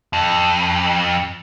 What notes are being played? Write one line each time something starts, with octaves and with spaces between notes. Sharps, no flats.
F2